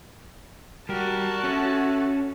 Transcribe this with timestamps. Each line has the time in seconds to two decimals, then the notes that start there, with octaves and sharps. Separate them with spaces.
0.89 G3 F#4 G4 A#4 A5
1.44 A3 C#4